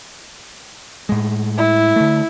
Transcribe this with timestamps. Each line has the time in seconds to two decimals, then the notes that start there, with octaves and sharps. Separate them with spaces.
1.09 A2 G#3
1.58 E4
1.96 D3 A3